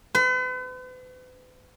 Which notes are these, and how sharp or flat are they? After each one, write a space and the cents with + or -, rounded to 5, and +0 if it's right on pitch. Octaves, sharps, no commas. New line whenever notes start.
B4 +45